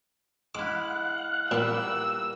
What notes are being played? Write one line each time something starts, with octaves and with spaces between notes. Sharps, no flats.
G#3 E4 F5 F#5 D6 F#6
A#2 G3 A#3 B3 E6